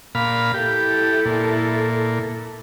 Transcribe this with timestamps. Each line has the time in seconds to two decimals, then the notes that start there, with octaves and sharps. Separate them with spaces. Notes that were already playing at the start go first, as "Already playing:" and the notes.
0.15 A#2 F5 B5
0.54 E4 G4 A4
1.26 A#2